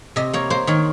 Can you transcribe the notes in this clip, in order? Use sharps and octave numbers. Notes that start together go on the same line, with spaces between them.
C3 D#5
A#3 C#5
A#3 C5
D#3 C#5